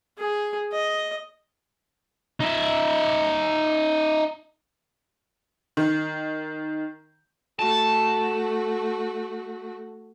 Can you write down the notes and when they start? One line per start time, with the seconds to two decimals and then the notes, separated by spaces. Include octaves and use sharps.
0.18 G#4
0.72 D#5
2.40 D#4 E5
5.77 D#3
7.59 A3 F#4 A5